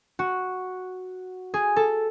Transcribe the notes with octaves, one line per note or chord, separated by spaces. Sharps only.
F#4
G#4
A4